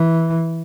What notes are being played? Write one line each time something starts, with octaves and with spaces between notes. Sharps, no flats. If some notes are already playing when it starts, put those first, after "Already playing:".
Already playing: E3